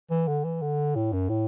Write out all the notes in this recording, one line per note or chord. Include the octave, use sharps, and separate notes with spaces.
E3
D3
E3
D3
A2
F#2
A2